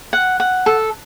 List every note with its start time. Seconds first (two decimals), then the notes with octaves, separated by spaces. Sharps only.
0.13 F#5
0.40 F#5
0.66 A4